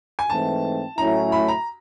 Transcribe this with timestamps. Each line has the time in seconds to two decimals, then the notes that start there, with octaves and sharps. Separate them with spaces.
0.19 G#5
0.30 G#2 E3 A3 C4 A5
0.98 A2 F#3 A3 C#4 E4 A#5
1.32 B5
1.48 A#5